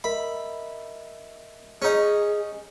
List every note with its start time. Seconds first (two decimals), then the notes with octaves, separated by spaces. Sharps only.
0.04 A#4 D#5 E5 B5
1.82 C#4 D#4 G#4